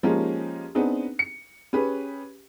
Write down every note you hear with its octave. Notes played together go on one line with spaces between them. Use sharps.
F3 G#3 A#3 C#4 D#4 G4
B3 C4 D4 D#4 G#4
C#7
C#4 G4 G#4 B4